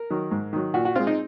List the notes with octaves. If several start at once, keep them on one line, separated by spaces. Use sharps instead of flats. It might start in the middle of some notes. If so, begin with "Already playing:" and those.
Already playing: A#4
D#3 F#3
G#2
D#3 F#3
A#2 F#4
F#4
G#3 C4 F4
D#4